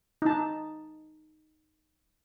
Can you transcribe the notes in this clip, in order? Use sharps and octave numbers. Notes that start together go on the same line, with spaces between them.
D#4 A5